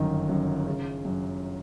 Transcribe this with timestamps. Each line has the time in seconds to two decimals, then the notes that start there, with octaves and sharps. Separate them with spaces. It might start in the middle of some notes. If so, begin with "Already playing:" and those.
Already playing: G1 F#2 D#3
0.29 F#2
0.66 C#3
1.05 F#2